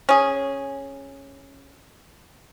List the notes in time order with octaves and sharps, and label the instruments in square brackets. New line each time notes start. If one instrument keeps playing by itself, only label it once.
[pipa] C#4 G#4